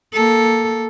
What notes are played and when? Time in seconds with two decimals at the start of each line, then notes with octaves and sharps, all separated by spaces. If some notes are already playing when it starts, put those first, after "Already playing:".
0.14 A#3 A4